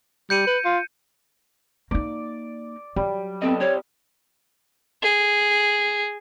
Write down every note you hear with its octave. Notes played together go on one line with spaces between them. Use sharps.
G3 G6 C#7 D#7
B4
F4
A#3 D#4 D5
F#3 G3
B3 C4 A4 D#5
C4 G4 C#5 D5
G#4